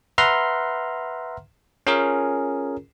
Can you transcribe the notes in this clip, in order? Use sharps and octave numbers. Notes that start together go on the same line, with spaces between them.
B4 E5 F#5 A#5 C6 F6
C#4 F4 G#4 A#4